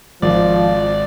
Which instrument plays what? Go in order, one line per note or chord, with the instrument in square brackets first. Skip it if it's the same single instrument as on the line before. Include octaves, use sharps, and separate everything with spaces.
[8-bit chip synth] G#1 D5 [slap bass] D#3 G#3 [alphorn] F3